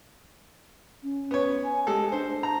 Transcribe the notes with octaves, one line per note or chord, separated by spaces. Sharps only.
C#4
B3 C#5
G#5
G#3 G4 A4
D4 C5
A5 A#5